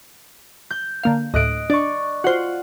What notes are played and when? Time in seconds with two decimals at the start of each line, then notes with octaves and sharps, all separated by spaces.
0.71 G6
1.03 D3 A#3 F5
1.34 D2 A2 D#5 F#6 D7
1.70 D4 D5 C#6
2.24 F4 F#4 C5 F#5